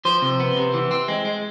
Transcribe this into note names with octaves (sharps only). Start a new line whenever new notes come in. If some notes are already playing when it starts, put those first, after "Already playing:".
F3 C5
C3
B3
C3
E3
C4
G#3
G#3